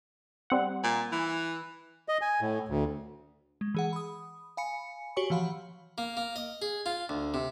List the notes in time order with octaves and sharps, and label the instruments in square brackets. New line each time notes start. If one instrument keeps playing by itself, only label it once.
[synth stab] G3 C4 F#5
[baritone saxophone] A#2
E3
[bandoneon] D#5
G#5
A2
D2
[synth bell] G#3
E3 G#4 F#5
B5 D#6
F5 G#5 B5 C#7
F#4 G4 C#5 G#5 C#6
E3 F3 F5 F#5 B5
[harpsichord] A#3
A#3
D#5
G#4
F4
D2
C3